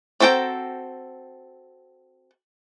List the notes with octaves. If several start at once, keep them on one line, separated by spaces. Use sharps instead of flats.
C4 F#4 A4 G5 A#5